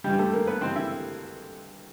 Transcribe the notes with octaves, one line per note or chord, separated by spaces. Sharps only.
G2 E3 G3 G#3 G4
A3 A4
A#3 A#4
B3 B4
G2 E3 G#3 C4 C5
E4 E5